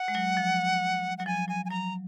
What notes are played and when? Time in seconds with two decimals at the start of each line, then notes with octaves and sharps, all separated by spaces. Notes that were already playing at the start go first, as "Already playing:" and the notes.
Already playing: F#5
0.08 G#3
0.15 F#3
0.37 F3
1.18 F#3 F#5
1.26 F3 G#5
1.48 F#3 G#5
1.65 G#5
1.70 F#3 A#5